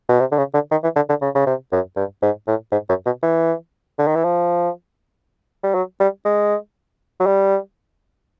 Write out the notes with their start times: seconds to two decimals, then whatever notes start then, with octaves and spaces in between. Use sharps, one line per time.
0.09 B2
0.20 C3
0.32 D3
0.38 C#3
0.54 D3
0.71 D#3
0.84 E3
0.96 D3
1.09 D3
1.21 C#3
1.35 C#3
1.47 C3
1.72 F#2
1.96 G2
2.22 G#2
2.47 A2
2.72 G#2
2.89 F#2
3.06 B2
3.23 E3
3.99 D3
4.07 D#3
4.16 E3
4.24 F3
5.64 G3
5.75 F#3
6.00 G3
6.25 G#3
7.20 F#3
7.27 G3